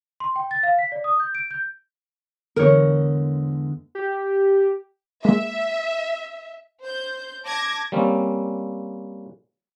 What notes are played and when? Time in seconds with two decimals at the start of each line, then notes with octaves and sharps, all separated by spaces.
0.20 C6
0.36 G5
0.51 A6
0.63 F5
0.79 B6
0.92 D5
1.04 D#6
1.20 G6
1.35 D7
1.51 G6
2.56 E2 D3 G#3 A#4 C#5
3.95 G4
5.25 G#3 A#3 E5
6.83 C5 G6
7.45 A5 D6 G#6 A#6
7.92 G3 A#3 C4 C#4